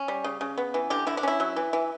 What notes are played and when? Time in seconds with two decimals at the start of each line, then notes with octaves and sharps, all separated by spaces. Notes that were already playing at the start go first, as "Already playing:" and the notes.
Already playing: C#4
0.08 G3
0.24 C#3
0.41 C#3
0.58 B3
0.74 E3
0.90 D3 G4
1.07 D3 E4
1.17 D4
1.23 C#4 E4
1.40 F#3
1.56 E3
1.73 E3